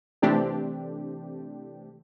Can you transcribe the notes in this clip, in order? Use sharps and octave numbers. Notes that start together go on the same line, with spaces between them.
C3 E3 A3 C4 D4 G4